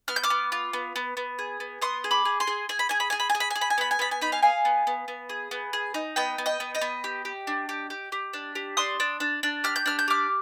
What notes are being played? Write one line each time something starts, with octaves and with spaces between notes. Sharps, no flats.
B3 F6
G6
D6 F6
B3
F4
B3
B3
B3
G#4
B3
B3 C6 D#6
G#4
B5 D6
G#4
G#5 C6
G#4
G#4 G#5
B5
G#4 G#5
B5
G#4 G#5
B5
G#5
G#4
B5
G#5
G#4
B5
G#5
B3 B5
G#5
B3 B5
G#5
D#4 B5
F5 G#5
G#4 F5 G#5
B3
B3
B3
G#4
B3
G#4
D#4
B3 D#5 G5
B3
D#5 G5
B3
D#5 G5
B3
G4
G4
D4
G4
G4
G4
D4
G4
D4 C6 D#6
D4
D4
D4
G4 F6
G6
D4 F6
G6
G4 D6 F6